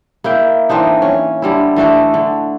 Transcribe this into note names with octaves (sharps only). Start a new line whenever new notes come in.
A#3 E4 G5
E3 C4 D4 D#4
C#4
D3 G3 E4
E3 A3 D4 A4
D3